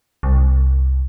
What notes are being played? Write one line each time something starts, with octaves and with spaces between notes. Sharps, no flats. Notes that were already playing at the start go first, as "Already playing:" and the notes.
C2